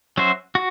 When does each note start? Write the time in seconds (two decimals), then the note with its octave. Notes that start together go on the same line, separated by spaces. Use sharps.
0.17 F#3 C#4 F#4 C5 E5
0.55 F#4